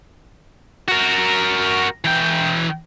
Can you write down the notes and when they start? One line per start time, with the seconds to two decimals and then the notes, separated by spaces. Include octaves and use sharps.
0.88 F#4 A#4
2.05 E3 G5